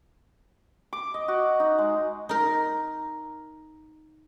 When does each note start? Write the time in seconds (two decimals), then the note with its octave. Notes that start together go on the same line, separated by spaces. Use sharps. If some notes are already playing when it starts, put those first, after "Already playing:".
0.93 D6
1.14 D#5
1.28 F#4
1.60 D#4
1.78 G#3
2.29 D#4 A#4